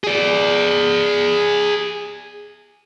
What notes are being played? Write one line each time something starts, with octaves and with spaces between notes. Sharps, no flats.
G#4 D5